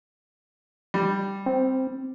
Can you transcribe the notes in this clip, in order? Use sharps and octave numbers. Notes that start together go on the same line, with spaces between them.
G3
C4